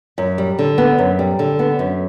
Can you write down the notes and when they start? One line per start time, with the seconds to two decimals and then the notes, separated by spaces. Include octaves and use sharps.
0.18 F#2
0.38 G3
0.59 D3
0.78 B3
0.98 F#2
1.19 G3
1.39 D3
1.59 B3
1.79 F#2